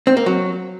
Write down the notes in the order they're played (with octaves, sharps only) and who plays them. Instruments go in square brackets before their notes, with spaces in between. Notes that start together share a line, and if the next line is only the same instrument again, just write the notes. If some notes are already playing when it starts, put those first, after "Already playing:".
[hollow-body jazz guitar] C4
A#3
F#3